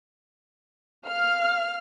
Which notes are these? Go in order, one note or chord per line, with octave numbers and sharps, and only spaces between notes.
F5 F6